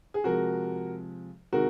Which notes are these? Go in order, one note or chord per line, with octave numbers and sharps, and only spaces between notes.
G#4
C3 F3 G#3 F#4 A#4
C3 D#3 G#3 F#4 A#4